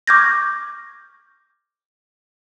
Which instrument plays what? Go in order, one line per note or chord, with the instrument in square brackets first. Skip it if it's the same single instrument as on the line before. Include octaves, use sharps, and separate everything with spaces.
[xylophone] C#6 D6 F6 G6 G#6 A#6